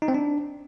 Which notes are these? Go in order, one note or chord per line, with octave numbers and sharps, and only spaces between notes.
D#4
C4
D4